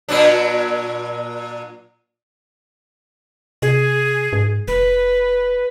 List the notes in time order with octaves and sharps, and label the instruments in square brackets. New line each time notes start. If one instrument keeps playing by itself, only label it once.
[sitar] A#2 F#3 D4
[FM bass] C3 [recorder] G#4
[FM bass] G#2
[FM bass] F1 [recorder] B4